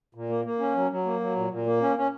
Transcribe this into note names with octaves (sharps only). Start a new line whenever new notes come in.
A#2
A#3
A#3
C#4
F#3
F#3
A#3
F#3
A#2
A#2
A#3
C#4
C#4